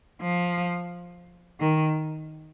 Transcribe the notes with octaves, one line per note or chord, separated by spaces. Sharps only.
F3
D#3